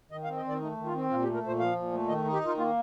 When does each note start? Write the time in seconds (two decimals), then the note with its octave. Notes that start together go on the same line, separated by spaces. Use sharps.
0.11 D#3 D#5
0.24 F5
0.28 C4
0.36 D#5
0.44 D#3 D5
0.60 A3 D#4
0.77 D#3
0.86 F4
0.94 C4
1.10 A#2 F4
1.23 G4
1.26 A3
1.34 A#4
1.43 A#2 C5
1.59 F3 F5
1.76 A#2
1.92 A3
2.08 D#3 D#5
2.25 D#4
2.33 G4
2.41 D#3 F4
2.58 A#3 F4